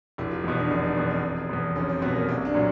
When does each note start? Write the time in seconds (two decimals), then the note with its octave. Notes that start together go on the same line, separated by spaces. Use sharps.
0.18 F1 E4
0.31 F4
0.44 E2 D#4
0.48 B2
0.58 D4
0.70 F1 D#4
0.84 D4
0.97 E2 B2
1.10 C4
1.23 F1
1.49 E2 B2
1.76 F1 C#4
1.89 C4
2.02 B2 B3
2.06 E2
2.15 A#3
2.28 C2 C4
2.45 D4
2.54 A#2 F#3